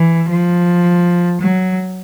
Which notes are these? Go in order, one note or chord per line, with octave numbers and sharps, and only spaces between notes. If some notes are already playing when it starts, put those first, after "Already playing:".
Already playing: E3
F3
F#3